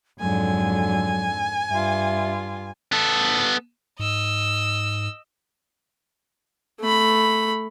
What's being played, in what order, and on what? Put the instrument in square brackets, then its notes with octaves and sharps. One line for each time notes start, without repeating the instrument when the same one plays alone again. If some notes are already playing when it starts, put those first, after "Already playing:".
[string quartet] F2 G#2 D3 [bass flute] F#3 [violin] G#5
[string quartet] G2 F4 [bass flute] E5
[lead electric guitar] B3 A4
[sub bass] G#2 [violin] D#5 E6
[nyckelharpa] A3 B5